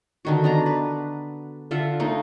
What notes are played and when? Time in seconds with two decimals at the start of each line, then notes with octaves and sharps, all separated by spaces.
0.25 D3 D#3 F#4
0.44 B3 D4 A#5
0.66 B4
1.71 D3 F4 E5 F#5
2.00 A3 A#3 D#4